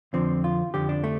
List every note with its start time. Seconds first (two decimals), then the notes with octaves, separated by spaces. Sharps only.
0.13 F2 D3 F3 C4
0.44 F4
0.74 F2 D3 F3 G4
0.89 D4
1.04 A3